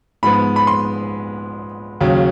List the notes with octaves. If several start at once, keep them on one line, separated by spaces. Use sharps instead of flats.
G#2 F3 G#3 B3 B5
B5
C6
D#2 C#3 F#3